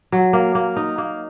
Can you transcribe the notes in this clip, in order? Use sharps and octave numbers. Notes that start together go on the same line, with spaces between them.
F#3
A#3
A#3
D#4
A#3